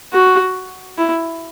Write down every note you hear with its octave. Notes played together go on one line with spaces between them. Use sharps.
F#4
E4